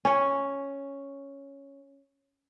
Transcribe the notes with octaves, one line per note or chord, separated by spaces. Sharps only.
C#4 C#5